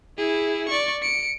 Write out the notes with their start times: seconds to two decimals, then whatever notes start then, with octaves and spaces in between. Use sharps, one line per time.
0.18 E4 G#4
0.69 D5 C#6
1.03 C#7 D7